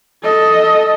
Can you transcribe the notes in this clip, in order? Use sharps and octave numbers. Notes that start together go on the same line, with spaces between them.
A4 D#5